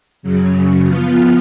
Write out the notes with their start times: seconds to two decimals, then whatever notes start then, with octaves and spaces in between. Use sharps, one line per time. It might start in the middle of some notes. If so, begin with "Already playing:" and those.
0.23 F#2 C#3 F#3
0.86 F3 B3 F4